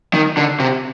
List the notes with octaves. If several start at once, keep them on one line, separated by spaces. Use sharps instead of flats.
D#3
D3
C3